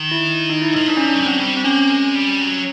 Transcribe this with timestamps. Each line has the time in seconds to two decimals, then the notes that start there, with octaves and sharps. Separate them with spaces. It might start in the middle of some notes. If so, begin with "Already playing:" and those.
Already playing: D#3
0.11 E4
0.50 D#4
0.62 E4
0.74 F3 D#4
0.88 E3 D4
0.97 C#4
1.07 D4
1.13 F#3
1.21 G3
1.26 F#3 C4
1.39 G3
1.57 C4
1.64 A#3 C#4
1.89 G#3
2.15 G3
2.41 F#3